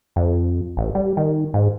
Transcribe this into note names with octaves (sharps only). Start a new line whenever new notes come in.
F2
A1
G3
D#3
G#2